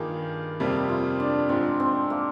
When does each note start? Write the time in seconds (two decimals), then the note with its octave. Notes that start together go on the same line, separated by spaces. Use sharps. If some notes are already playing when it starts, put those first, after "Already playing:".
Already playing: G2 D#3 A#3 F4 G4 G#4
0.60 F2 C3 G3 A#3
0.89 F4
1.20 D4
1.49 G#2 F3 G#3 C4
1.80 C4
2.10 A#3